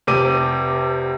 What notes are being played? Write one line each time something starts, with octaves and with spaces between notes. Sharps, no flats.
F1 C3 G4 D6 D#7